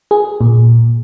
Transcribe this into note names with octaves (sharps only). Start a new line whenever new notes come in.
G#4
A#2